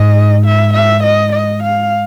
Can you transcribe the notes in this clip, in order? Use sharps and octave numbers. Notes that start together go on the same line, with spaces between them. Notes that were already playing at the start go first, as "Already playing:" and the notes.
Already playing: G#2 D#5
E5
E5
D#5
D#5
F5